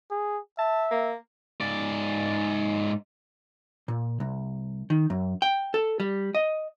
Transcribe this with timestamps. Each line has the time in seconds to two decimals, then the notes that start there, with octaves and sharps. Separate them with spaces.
0.11 G#4
0.59 E5 A5
0.91 A#3
1.61 G#2 D5
3.88 A#2
4.20 C2
4.90 D#3
5.10 F#2
5.42 G5
5.74 A4
6.00 G3
6.35 D#5